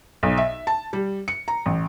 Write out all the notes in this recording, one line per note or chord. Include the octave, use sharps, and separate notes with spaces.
B1
E5
A5
G3
C#7
A#5
A1